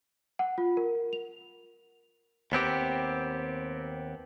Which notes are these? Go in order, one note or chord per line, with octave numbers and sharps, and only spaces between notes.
F#5
F4
A#4
F7
D#2 B3 C4 G4